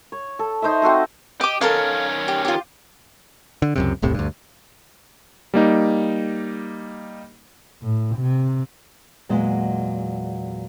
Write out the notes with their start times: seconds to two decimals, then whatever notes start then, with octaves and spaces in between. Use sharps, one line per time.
0.12 C#5
0.39 A4
0.62 D#4 C5 C#5 E5
0.82 C4 F#4 A4 C5
1.41 G4 D#5 D6
1.61 D#3 C#4 A4 A#4 F5
2.28 G4
2.45 F4 G4
3.62 D3
3.76 C#2 F#2 C3
4.02 E1 C2 A2 C3
4.14 D2 G2
5.54 G3 A#3 D#4
7.83 A2
8.16 C3
9.29 E2 A#2 F#3 G#3 D#5